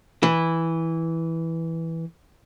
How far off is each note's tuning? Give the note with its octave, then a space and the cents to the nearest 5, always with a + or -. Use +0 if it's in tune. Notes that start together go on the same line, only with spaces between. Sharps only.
E3 -5